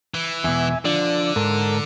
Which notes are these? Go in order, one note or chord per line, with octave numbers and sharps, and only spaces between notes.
E3
E2 B2 E5 G#5
D3 F3 D4 D5
G#2 A4 A#4